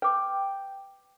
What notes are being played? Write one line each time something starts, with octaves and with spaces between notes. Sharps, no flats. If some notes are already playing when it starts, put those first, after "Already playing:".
B4 G5 D6